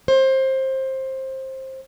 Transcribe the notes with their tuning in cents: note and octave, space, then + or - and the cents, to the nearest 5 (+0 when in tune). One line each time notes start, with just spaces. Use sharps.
C5 +20